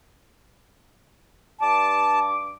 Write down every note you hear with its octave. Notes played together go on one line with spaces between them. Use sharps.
G2 A5 D6